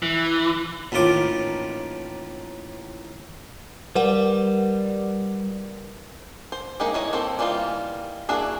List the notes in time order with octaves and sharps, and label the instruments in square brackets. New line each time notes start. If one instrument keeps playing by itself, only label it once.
[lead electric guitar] E3
[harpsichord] A1 D#2 A2 F4 D6
[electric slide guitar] G3 [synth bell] A#4 B4 F#5
[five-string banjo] C5
A#3 D#4 G4 G#4
E4 C#5 D#5
A#3 C4 A4 C5
E3 G3 A#3 D#4 F4
A#3 D4 E4 F#4 G#4